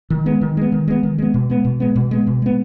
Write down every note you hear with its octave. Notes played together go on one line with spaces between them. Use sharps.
D#3
G#3 B3
D#3
G#3 B3
D#3
G#3 B3
D#3
G#3 B3
B2
G#3 B3
B2
G#3 B3
B2
G#3 B3
B2
G#3 B3